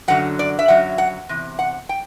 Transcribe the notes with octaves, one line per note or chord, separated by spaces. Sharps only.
F#2 D3 F#3 F#5
D5
E5
F#2 D3 F#3 F#5
F#5
E2 C3
F#5
G5